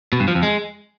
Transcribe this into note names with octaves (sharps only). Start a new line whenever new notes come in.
B2
G2
F3
F2
G#3